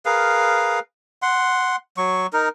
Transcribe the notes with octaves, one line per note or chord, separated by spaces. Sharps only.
G#4 A#4 B4 F5
F#5 C6
F#3 C#6
D#4 A#4